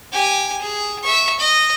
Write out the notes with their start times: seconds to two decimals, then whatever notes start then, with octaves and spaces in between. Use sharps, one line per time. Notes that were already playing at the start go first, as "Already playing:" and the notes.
0.12 G4 G#5
0.61 G#4
1.03 E5 C#6
1.40 D#5